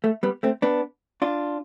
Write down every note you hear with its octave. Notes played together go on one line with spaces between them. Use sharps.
A3
G3 B3
A3 C4
B3 D4
D4 F4